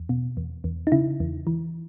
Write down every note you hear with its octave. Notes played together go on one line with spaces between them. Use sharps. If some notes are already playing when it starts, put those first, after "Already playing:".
Already playing: E2
B2
E2
E2
D#4
C#3 E4
E2
E3